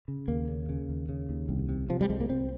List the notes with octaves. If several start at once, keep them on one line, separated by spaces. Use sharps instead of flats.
C#3
D#2 A#3
C#3
C#3
D#2
C#3
D#2
C2
C3
C3 F3
G3
C2 G#3
A#3
C2 C4